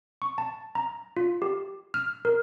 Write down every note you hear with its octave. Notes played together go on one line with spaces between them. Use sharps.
C#6
A5
A#5
F4
G4
F6
A#4